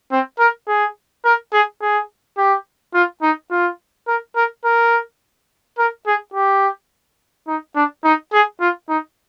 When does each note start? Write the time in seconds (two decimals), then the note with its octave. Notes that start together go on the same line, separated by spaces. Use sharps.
0.11 C4
0.39 A#4
0.68 G#4
1.25 A#4
1.53 G#4
1.81 G#4
2.38 G4
2.94 F4
3.22 D#4
3.51 F4
4.07 A#4
4.36 A#4
4.65 A#4
5.78 A#4
6.07 G#4
6.34 G4
7.48 D#4
7.75 D4
8.04 D#4
8.33 G#4
8.60 F4
8.89 D#4